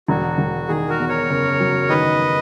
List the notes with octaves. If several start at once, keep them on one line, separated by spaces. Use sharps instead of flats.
E1 F#4
E1
D#3 G#4
F#4 A#4
E2
A#4 C#5
F#1
F#3
D#3 B4 D#5